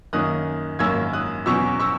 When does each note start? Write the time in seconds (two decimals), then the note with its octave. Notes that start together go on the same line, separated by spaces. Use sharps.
0.13 F#2 D#3 A#3 C#4 D#6 F#6
0.79 G#1 F#2 D#3 A#3 C#4 E6 G#6
1.13 D#6 F#6
1.46 E2 B2 F#3 C#4 C#6 E6
1.80 C#6 E6